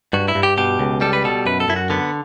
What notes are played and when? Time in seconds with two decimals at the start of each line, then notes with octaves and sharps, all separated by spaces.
0.13 G2 F#4
0.28 E4
0.35 G2
0.43 G4
0.58 B2 G4
0.79 C#2
1.01 G3 A4
1.13 B4
1.24 B2 A4
1.46 F#2 B4
1.60 A4
1.68 F#2 E4
1.76 F#4
1.90 D3 B3